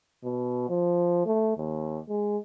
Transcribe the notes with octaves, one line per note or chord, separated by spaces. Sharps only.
B2
F3
A3
D#2
G#3